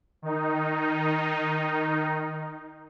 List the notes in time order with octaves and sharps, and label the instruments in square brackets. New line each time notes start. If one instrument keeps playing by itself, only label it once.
[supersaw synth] D#3 D#4